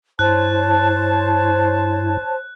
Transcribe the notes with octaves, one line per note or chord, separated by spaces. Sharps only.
G2 E4 C5 C#5 A5 F#6